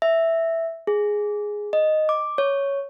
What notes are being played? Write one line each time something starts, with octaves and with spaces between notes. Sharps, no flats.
E5
G#4
D#5
D6
C#5